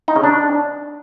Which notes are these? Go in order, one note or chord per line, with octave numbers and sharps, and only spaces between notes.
D#4
C#3
D4